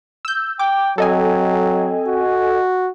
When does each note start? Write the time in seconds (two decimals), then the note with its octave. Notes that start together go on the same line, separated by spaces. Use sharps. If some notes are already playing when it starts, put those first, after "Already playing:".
0.25 E6 G6
0.59 G5 D6
0.98 F#3 C4 A4 D#5 G#5
2.08 F#4